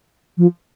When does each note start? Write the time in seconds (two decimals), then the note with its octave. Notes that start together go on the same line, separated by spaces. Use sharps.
0.38 F3